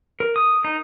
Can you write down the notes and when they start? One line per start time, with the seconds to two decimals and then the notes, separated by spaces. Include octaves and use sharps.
0.20 A#4
0.36 D#6
0.65 D#4